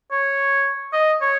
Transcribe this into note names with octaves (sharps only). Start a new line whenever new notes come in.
C#5
D#5
C#5